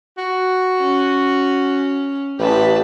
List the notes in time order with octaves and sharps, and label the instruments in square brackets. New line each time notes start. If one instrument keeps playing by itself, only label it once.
[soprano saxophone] F#4
[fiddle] C#4
[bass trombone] A1 [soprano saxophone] G4 [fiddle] B4 A5